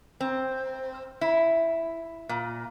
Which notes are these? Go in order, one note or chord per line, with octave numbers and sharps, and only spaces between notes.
C4
E4
A#2